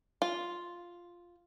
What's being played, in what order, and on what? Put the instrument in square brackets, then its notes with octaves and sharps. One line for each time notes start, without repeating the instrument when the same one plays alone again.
[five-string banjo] F4